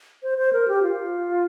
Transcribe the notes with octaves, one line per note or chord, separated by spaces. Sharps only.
C5
C5
A#4
G4
F4